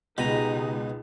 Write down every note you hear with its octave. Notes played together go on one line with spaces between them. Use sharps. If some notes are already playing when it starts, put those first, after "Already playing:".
C#2 B2 G#3 D#4 G4 D#5 A#5 B5